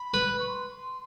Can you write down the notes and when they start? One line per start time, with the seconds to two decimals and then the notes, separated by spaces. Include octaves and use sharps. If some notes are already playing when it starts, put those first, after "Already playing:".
Already playing: B5
0.14 B4
0.40 C#6
0.48 C6